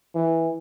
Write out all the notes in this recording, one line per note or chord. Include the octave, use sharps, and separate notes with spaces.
E3